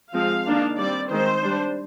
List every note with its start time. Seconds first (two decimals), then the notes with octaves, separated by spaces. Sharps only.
0.13 F3 G#3 C4 F5
0.46 D#3 A#3 D4
0.78 G3 C4 D5
1.10 D#3 G#3 C4 C5
1.43 G3 D4